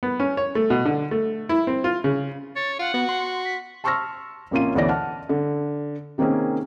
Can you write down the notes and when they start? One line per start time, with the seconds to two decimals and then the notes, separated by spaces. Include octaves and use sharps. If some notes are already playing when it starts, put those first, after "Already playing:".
0.03 B3
0.20 C#4
0.37 C#5
0.55 A3
0.70 B2
0.85 D3
1.11 A3
1.49 E4
1.67 C4
1.84 F4
2.04 C#3
2.56 C#5 A6
2.79 F4 F#5
2.94 B3 F#4
3.09 C6
3.45 B6
3.84 A5 C6 C#6 E6 F6 A#6
4.51 A1 C3 A#3 C#4 F4 D#7
4.75 D2 B2 E3 C#5 D5 A#6
4.89 F#5 A5 F6
5.29 D3
6.18 C3 D#3 A#3 C4 C#4 G#4